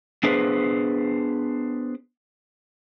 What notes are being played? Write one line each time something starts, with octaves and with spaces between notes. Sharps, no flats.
B3 D4 G#4 B4 C5